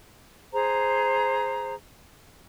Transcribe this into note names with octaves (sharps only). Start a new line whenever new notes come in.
G#4 C5 A#5